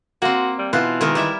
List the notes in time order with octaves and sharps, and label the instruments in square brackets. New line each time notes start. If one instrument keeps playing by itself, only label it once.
[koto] A#3 C4 [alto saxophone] F#4
[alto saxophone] G3
[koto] B2 B3 F4 [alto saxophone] E3
[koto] D#3 G#3 A#4
G3 E4 E5